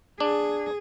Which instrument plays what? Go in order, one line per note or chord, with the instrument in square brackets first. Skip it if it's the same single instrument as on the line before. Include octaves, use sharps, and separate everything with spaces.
[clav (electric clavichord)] D4 [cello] G#4